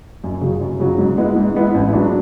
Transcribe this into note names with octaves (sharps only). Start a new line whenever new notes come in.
F#2
C#3 F#3
F#2
C#3 F#3
G#2
G#3 B3 E4
G#2
G#3 B3 E4
A1
G#2 F#3 B3 D4